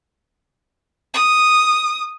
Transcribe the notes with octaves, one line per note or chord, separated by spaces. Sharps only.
D#6